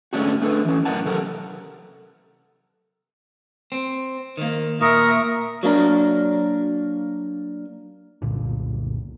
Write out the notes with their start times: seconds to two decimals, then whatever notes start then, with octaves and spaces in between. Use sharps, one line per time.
0.13 G#2 D3 A3 C#4 D4 F#4
0.42 A3 D4 A4 B4
0.65 E3 C#4
0.85 F#2 A2 A#4 F#5 A5
1.05 C3 F#3 A4 A#4
3.72 C4
4.37 D#3 A#3
4.81 A#2 A#4 E5 C#6 D#6
5.63 F#3 A#3 D4 A#4
8.22 F#1 C2 A#2 D3